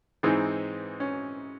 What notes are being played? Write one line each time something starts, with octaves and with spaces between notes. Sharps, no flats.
G#2 E3 G#3 C4 D#4
C#4